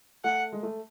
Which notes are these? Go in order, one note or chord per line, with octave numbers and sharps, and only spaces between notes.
A3 F#5
G#3
A3